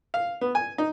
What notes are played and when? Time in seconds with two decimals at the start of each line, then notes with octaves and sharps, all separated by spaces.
0.14 F5
0.41 B3
0.55 G#5
0.78 D#4